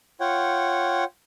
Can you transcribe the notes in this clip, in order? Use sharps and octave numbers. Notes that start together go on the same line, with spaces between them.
F4 C#5 F#5 G5